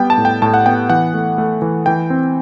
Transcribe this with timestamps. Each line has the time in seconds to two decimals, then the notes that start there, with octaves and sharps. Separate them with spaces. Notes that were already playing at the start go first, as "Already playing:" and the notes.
Already playing: G3 B3 G5
0.10 A5
0.18 A2
0.25 G5
0.42 A2 A5
0.54 F#5
0.66 B3 G5
0.90 E3 F#5
1.14 A3
1.38 A3
1.62 E3
1.86 E3 G5
2.10 C4